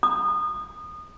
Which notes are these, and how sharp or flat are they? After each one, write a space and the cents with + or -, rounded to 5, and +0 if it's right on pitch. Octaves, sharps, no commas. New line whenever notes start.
D#6 -25